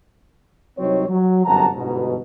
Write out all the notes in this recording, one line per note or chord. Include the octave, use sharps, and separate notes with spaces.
C2 F#3 C4 D#4 C#5
F#3
G1 F#2 C3 F#5 A5 A#5
G1 G#2 B2